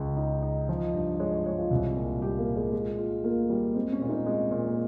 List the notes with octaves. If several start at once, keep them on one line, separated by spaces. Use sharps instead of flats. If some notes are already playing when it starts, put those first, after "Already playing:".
Already playing: C#2 G#3
D#4
D#4
F3 D#5
G2
G#3 C#5
C#5
G#3 C#5
F4
C2
A#2
G3 G4
A#3
A#2
G#3
G#3 F4
F4
A#3 F4
G3
G#3 C4
C#4
A#2
D#4
G#3 C4
A#2
A#3